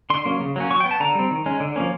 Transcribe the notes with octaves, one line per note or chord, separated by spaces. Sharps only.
D3 C6
F#3 A#3 C#4
C#3
F#3 A#3 C#4
F#3 C#6
B3 G5
A5
D3 A#5
G3 C4
D#3
G#3 C#4
D3
F3 A#3 C#4